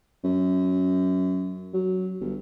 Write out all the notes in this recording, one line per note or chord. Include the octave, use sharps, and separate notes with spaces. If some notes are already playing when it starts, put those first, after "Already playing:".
F#2
F#3
G1